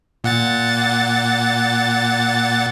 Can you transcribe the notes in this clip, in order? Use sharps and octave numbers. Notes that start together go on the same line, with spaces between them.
A#2 F#5 A6